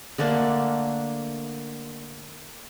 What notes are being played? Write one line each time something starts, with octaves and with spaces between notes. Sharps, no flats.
D3 A3 A#3 D4